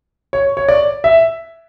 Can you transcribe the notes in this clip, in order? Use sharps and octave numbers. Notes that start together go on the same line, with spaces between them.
C#5
C#5
D5
E5